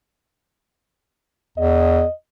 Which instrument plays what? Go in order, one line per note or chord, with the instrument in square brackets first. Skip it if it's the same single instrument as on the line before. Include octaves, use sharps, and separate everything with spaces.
[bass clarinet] E2 [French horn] D#5